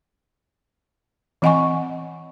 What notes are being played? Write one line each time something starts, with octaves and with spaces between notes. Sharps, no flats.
E3 C4 D#5 F#5 G#5 C#6